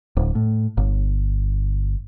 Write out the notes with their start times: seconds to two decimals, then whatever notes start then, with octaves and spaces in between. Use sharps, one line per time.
0.17 D1
0.35 A2
0.77 G1